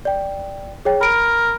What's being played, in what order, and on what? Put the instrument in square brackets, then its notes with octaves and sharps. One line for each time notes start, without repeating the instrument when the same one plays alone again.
[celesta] D5 G5
G#4 C#5 G5
[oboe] A#4 [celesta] B5 D7